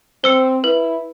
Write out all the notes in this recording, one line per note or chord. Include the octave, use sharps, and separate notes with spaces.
C4 C5 E6 C#7
E4 B4